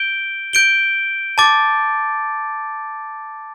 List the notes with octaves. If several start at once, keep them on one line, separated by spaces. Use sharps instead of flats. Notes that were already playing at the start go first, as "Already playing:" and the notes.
Already playing: G6 D7 G7
G6 D7 G7
A5 D6 A6